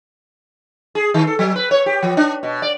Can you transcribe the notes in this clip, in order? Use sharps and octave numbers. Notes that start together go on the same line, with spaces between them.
G#4
D#3
A4
F#3
B4
C#5
G4
F3
D4
B2
D5